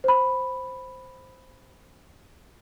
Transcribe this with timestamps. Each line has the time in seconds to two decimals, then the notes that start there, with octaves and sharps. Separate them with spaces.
0.04 C5 B5